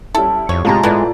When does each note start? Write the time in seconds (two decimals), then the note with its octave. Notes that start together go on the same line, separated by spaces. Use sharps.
0.15 G3 C#4 E4 A4
0.49 F2 C#5
0.65 A2 C3 G#3 F4 G4 A5 A#5
0.83 A2 E3 G#3 A3 B3 D5